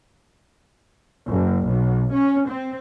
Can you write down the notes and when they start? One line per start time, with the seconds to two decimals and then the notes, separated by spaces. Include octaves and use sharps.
1.27 F#1
1.66 B1
2.13 C#4
2.48 C4